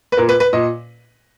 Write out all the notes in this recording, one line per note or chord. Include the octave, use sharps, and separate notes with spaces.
B4
A#2 A#4
B4
B4
A#2 D#5